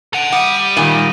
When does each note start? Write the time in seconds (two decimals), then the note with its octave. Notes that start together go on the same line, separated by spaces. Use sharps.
0.13 A4 F#5 D7 D#7 F7
0.32 G3 F#5 D#6 D#7
0.77 A#2 D#3 D#7